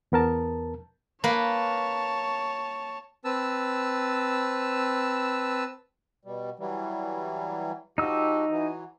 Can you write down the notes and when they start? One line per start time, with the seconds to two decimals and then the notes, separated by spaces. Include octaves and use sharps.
0.12 E2 B3 A#4 A5
1.24 A#3 B4 C#5 A5
3.25 C4 B4 A5 E6
6.25 B2 G3
6.59 E3 F#3 G3
7.98 F3 D#4 F#4 G4 E6
8.50 E3 F#3